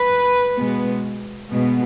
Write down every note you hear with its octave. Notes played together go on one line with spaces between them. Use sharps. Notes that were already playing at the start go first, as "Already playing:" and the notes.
Already playing: B4
B2 G#3 B3
B2 G#3 B3